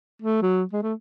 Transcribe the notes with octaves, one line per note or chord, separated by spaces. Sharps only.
A3
F#3
G#3
A3